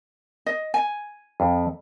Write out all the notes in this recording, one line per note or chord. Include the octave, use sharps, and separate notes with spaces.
D#5
G#5
F2